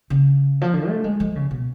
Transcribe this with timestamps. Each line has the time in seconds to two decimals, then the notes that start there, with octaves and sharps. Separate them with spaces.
0.10 C#3
0.61 F3
0.74 D3
0.88 A3
1.04 G#3
1.20 F3
1.36 C#3
1.51 B2